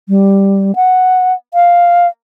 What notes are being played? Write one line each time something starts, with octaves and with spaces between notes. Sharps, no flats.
G3
F#5
F5